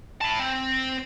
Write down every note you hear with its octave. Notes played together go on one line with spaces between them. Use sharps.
E4 A5
C4